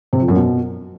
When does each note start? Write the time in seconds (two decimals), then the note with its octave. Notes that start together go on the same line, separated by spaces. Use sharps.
0.13 C3
0.20 F2
0.28 F#2
0.36 B2